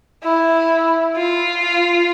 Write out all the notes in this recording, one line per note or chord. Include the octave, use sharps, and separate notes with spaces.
E4
F4